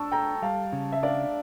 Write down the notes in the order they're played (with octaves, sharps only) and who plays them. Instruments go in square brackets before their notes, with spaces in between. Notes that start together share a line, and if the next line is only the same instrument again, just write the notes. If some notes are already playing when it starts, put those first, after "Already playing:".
Already playing: [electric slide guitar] D4 [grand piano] A5 C#6 E6
[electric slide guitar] A4 [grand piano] G5 A#5
[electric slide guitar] G3 [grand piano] F5 A5
[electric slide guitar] C#3
[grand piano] E5
[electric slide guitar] D4 [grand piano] D5 F5